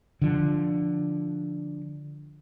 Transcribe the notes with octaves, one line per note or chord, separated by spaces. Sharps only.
D3 F3